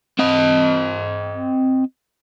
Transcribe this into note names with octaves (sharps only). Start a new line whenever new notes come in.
C4 D#5